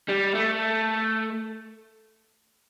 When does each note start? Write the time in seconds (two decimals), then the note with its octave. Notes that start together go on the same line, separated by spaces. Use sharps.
0.09 G3
0.35 A3